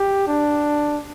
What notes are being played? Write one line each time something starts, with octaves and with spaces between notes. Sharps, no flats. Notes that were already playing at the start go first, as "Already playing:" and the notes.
Already playing: G4
D4